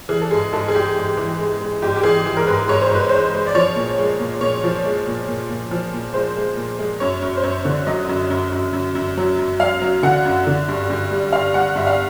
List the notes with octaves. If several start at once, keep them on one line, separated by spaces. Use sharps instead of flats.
E3 G#4
A4
G#2 G#4
G#2 A4
G#4
G#2 G4
G#2
E3
G#3
G#3
G#2 G4
G4
E3 G#4
E3
A#4
G#2 B4
G#2 C#5
C5
G#2 B4
G#3 C5
G#3
D5
F3 C#5
A#2
G#3
A#2
A#2 C#5
F3
G#3
A#2
A#2
A#2
F3
A#2
G#3 C5
G#3
A#2
G#3
F#2 C#5
F#2
C5
F#2 C#5
D3
F#3 D#5
F#2
F#2
F#2
F#2
F#2
F#3
F#2
F#3 F5
F#3
D3 F#5
F#2
D3
G2
G2
G3
G2 F5
G3 F#5
G2 E5
F5